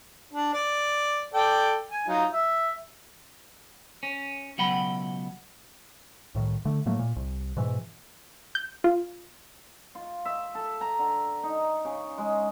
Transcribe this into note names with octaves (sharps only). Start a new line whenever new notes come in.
D4
D5
A4 D5 G5
G#5
F#3 D#4 F4
E5
C#4
C#2 B2 F#3 F#5 G5 B5
C2 A2 D#3
D3 A3
A2 F#3 A3 A#3
A#2
C2
G#2 B2 E3
G6
F4
F4
E5
A4
A#5
D3
D#4
C#3
G#3